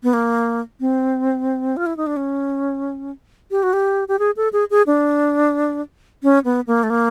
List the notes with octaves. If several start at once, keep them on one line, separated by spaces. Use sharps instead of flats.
B3
A#3
C4
F4
E4
D#4
D4
C#4
G4
F#4
G4
G4
G#4
A4
G#4
G#4
D4
C#4
B3
A#3
A3
A#3